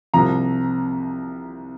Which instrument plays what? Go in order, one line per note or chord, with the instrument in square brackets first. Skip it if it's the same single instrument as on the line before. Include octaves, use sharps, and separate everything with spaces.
[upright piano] C2 C3 F3 A#5